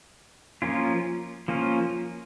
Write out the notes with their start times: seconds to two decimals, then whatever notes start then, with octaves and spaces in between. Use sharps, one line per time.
0.62 F3 A#3 C#4 F4
1.48 F3 A#3 C#4 F4